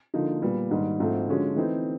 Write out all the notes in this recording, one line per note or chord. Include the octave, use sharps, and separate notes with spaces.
D3 F3 A#3 D#4
A#2 G3 B3
G#2 D#3 G3
G#2 F3 A3 C4
D3 F3 G#3 C#4 F#4
E3 A3 C4 D#4